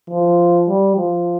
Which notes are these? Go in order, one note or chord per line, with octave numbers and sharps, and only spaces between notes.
F3
G3
F3